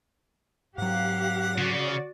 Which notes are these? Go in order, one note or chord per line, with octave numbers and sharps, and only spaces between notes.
G#2 F#3 G4 F5 F#5
C#3 F#4 D5